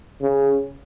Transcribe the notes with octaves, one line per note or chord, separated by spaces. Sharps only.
C#3